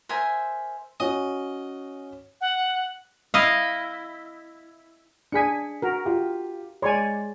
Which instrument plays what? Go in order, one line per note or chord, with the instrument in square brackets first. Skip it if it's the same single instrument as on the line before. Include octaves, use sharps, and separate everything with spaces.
[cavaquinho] A#4 C5 E5 G#5
[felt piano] C#4 F#4 C#5 [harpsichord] D#5
[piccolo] F#5
[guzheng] E4 D#5 F5
[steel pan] D4 G#4 G#5 [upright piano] B6 C#7
[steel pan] F#4 A#4
[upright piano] F4 G4
[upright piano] G#3 C6 D6 [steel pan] C#5 D5 G#5